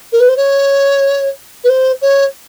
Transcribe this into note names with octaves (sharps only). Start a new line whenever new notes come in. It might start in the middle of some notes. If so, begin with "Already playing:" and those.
A#4
B4
C5
C#5
B4
C5
C#5